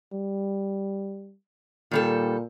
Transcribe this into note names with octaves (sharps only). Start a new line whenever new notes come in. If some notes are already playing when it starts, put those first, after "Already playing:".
G3
A#2 D#3 G3 A4